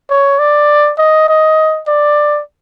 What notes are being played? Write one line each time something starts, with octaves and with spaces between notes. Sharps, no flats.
C#5
D5
D#5
D#5
D5